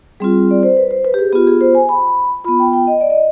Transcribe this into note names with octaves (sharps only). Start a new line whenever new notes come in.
G3 C4 F4 G#4
D5
C5
B4
C5
B4
G4
G#4
B3 F4 G4
G#4
C5
G#5
B5
B3 F4 B5
G5
G5
D#5
D5
D#5